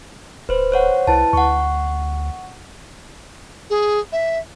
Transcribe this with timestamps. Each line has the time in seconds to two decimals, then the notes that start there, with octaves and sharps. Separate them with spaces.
0.49 D1 B4 C5
0.72 C5 C#5 F#5
1.07 C2 E4 B4 A5
1.33 D2 F#5 C#6
3.70 G#4
4.12 E5